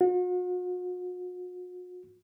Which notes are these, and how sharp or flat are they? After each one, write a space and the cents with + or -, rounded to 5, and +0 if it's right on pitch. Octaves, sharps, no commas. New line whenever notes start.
F#4 -45